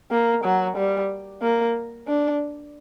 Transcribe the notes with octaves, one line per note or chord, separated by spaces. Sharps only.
A#3
F#3
G3
A#3
D4